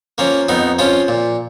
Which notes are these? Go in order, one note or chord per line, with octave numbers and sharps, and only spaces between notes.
F3 A#3 C#4
F2 B3 D#4
F3 C#4 F4
A#2